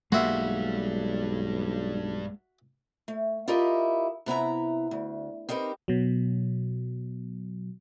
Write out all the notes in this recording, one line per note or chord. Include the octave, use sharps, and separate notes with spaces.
B1 G2 G#3 A#3 F#4 G4 E5 F5
A3
E4 F4 G4 A#4 D#5
C3 B3 E4 A#5
D2
C4 D#4 G4 A#4 B4
B2 F#3